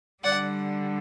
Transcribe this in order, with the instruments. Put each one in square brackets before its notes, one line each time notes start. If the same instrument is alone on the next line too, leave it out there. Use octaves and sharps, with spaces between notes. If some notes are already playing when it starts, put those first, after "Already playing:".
[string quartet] D3 G3 D5 F#5